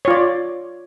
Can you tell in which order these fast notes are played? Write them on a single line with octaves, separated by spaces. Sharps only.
C#5 F4 D5